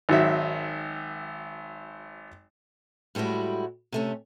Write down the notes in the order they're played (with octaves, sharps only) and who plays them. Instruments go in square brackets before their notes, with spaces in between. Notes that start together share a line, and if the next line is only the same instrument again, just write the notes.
[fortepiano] G#1 D#3 F#3 E5
[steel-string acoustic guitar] A2 G3 G#3 E4 F#4
C3 A3 C#4